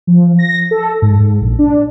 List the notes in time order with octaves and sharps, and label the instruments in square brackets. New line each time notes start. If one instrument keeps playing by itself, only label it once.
[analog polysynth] F3
A#6
A4
G#2
G#2
A#1
D4